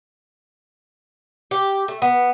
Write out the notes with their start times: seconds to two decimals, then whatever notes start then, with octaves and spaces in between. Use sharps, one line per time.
1.51 G4
1.88 A3
2.02 B3